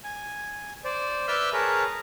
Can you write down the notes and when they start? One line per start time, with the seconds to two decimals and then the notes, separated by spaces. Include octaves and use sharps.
0.04 G#5
0.84 C5 D5
1.28 B4 D5 E5 E6 F6 G6
1.53 G#4 A#4 B4 C#5 A5 A#5